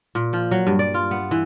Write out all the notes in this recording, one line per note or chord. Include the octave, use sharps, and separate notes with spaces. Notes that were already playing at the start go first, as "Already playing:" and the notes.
A#2
F3
F#3
G2
D5
F4
B3
E3